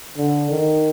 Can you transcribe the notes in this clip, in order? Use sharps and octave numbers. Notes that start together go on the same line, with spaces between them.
D3
D#3